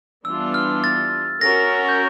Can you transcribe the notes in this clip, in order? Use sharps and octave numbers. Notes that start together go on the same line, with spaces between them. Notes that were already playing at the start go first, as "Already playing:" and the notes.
E3 G3 B3 D4 F4 E6
F6
A6
C#4 F#4 A#4 A#6
G6